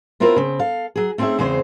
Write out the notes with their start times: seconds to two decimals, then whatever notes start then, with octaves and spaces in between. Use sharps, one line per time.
0.20 B3 C4 E4 F4 A#4
0.36 C#3 C4
0.59 A4 F5
0.95 F#3 G#4
1.18 A3 C4 C#4 D#4 G#4 E5
1.39 E2 C#3 G#3 C4 C5